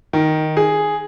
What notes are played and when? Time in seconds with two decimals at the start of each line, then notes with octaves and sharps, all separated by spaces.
0.13 D#3
0.57 G#4